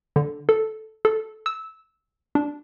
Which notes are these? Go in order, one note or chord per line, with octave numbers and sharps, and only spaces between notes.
D3
A4
A4
E6
D4